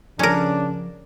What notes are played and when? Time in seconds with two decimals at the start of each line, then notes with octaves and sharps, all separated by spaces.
0.19 C#3 F3 C#4 D4 A#4